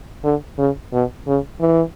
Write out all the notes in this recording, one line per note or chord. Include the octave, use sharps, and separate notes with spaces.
D3
C#3
B2
C#3
E3